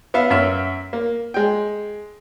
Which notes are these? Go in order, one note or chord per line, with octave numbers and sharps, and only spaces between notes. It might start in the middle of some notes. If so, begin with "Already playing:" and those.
B3 E5 F5
F#2 E5 F6
A#3
G#3 G5